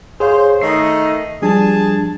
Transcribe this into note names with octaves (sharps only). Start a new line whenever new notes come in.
G#4 C5 C#5 F5
D#3 A3 D#5 C7
F3 G3 D4 G#4 A5